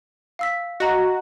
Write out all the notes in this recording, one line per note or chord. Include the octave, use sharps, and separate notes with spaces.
F5 E6 B6
F#4 D#5 A#5